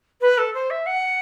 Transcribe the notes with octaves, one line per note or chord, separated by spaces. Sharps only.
B4
A4
C5
E5
F#5